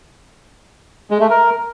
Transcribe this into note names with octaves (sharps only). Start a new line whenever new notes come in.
G#3
A3
A#4